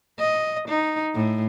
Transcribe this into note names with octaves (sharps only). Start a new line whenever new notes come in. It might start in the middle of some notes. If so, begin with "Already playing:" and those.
D#5
D#4
A2